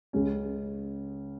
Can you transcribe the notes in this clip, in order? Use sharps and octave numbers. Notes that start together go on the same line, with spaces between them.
C#2 C#3 G#3 C#4